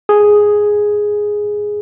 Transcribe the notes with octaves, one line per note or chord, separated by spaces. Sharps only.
G#4